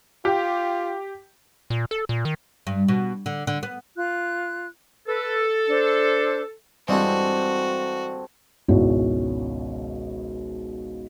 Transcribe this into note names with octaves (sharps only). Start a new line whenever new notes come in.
F4 G4
A#2
A4
A#2
D#3
G2
B2
D3
D3
B3
F4 F#6
A4 B4
D4 C5
G2 E3 G3 G#3 C4 F#4 A4
G#1 C#2 B2 C#4 E4 F#4